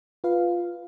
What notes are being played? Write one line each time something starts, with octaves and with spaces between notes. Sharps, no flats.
F4 B4 F5